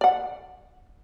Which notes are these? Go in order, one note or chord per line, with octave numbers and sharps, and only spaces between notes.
D5 F#5